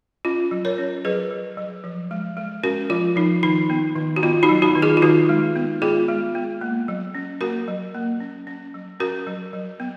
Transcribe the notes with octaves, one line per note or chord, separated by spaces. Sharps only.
C#4 F4
F#3
A#4 C#5
C#4
F#3 G#4 B4
F#3
F#3
F3
G#3
G#3
C#4 F#4 A#4
F3 F4
F3 D#4
D#3 D#4
B3
D#3
F#4
B3 F4
D#4 F#4
F#3
D#4 F#4
D#3
F4 G#4
F4
D#3 D#4 F#4
G#3
B3
B3 F4 G#4
G#3
B3
A#3
F#3
C#4
A#3 F#4 A#4
F#3
A#3
C#4
C#4
F#3
C#4 F#4 A#4
F#3
F#3
B3